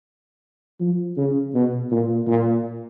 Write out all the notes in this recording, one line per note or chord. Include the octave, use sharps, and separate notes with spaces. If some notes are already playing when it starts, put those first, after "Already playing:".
F3
C#3
B2
A#2
A#2